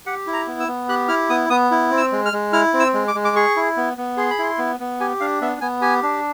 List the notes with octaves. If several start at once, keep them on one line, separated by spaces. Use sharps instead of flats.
G4 F#5
E4
A#5
B3
E6
B3
G4 F#6
E4 F6
B3 D#6
B3 D#6
E4
C4
E6
G#3
F6
G#3
E4 F6
C4
E6
G#3
D6
G#3
D6
G#4 C#6
E4
B3
B3
G#4 C6
B5
E4 C6
B3
B3
G4 G#5
D4 F5
B3 E5
B3 G#5
G4 G#5
D4